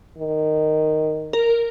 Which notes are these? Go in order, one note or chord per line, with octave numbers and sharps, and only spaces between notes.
D#3
A#4